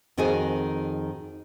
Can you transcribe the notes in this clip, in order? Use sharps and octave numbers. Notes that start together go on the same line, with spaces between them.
F2 D#3 F#4 G#4 D#5 G#5